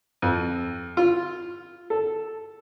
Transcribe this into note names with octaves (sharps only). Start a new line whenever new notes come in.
F2
F4
A4